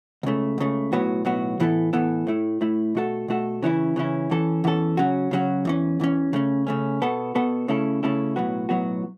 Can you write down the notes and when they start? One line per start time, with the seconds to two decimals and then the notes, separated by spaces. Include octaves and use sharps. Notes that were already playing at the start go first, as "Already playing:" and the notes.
0.23 C#2 C#3 A3
0.58 C#2 C#3 A3
0.92 B1 A2 F#3 B3 F#4
1.25 B1 A2 F#3 B3 F#4
1.60 A2 E3 B3 E4 A4
1.93 A2 E3 B3 E4 A4
2.27 A2 A3 E4
2.61 A2 A3 E4
2.95 B2 A3 F#4 A4
3.28 B2 A3 F#4 A4
3.62 C#3 E3 C#4 E4
3.96 C#3 E3 C#4 E4
4.30 E2 E3 C#4 A4
4.64 E2 E3 C#4 A4
4.97 C#3 F#3 C#4 F#4
5.31 C#3 F#3 C#4 F#4
5.65 E2 E3 C#4
6.00 E2 E3 C#4
6.33 C#3 A3 C#4
6.67 C#3 A3 C#4
7.02 B2 B3 A4
7.35 B2 B3 A4
7.68 C#3 A3 C#4 E4 A4
8.03 C#3 A3 C#4 E4 A4
8.36 B1 A2 F#3 B3 F#4
8.69 B1 A2 F#3 B3 F#4